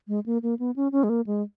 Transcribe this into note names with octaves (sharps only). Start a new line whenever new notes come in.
G#3
A#3
A#3
B3
C#4
C#4
G#3
A#3
G#3